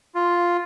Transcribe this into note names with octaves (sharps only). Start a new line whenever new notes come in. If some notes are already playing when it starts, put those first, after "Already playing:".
F4